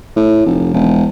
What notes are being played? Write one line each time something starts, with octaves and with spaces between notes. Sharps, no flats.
A2
F1
E1